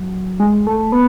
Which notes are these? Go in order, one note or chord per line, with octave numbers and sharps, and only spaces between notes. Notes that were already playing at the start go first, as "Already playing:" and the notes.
Already playing: F#3
G#3
A3
B3